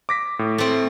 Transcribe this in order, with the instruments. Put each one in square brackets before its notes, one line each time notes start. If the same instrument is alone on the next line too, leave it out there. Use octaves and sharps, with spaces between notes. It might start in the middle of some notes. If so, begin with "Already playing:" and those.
[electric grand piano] D6 A#6 B6
A2
[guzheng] A3 C4